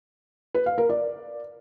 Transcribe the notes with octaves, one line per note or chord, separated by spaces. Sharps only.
B4
F5
A#4
D5